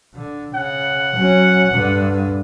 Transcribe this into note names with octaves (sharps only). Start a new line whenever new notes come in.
D3
C#3 F#5
F#3 C#4
G2 D3